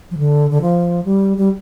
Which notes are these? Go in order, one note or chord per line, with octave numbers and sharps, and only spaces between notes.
F3
D3
D3
F3
G3
G3